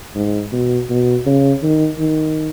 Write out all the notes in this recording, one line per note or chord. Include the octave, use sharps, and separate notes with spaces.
G#2
B2
B2
C#3
D#3
D#3